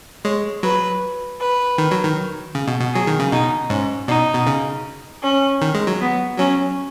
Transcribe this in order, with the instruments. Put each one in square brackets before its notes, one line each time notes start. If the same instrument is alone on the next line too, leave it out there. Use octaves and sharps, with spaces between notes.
[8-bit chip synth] G#3 [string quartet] C#5
[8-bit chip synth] F#3 [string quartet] B4
[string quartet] B4
[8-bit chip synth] D#3
F#3
D#3
C#3
B2
B2
[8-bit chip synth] F#3 [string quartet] G#4
[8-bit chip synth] D#3
C#3
[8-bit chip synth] B2 [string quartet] D#4
[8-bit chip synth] G#2 [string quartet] C#4
[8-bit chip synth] B2 [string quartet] D#4
[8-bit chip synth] B2
C#3
[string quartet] C#4
[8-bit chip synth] D#3
G#3
F#3
[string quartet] B3
[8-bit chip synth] F#3 [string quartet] C#4